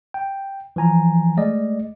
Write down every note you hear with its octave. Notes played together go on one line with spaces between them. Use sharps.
G5
E3 F3 G#5 A#5
G#3 A3 D5 D#5